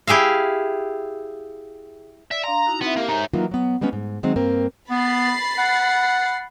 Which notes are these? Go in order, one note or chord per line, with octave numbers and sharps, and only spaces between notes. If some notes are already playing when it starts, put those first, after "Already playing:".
E4 G4 G#4 E5 F5
D5 E5
D4 F5 A#5 C6
D#4 E4 F#4
B3 C4 E4 E5
A#3 G4 A#4
G#3 D#4 C#5 E5
E3 F#3 A#3 D#4 F4
F#3 B3
G3 G#3 B3 C#4
G#2
D#3 F#3 G#3 C4
G2 A#3 C4 A#4
B3 B5 A6 C7
F#5